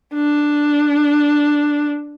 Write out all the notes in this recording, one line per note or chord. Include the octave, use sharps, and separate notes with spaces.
D4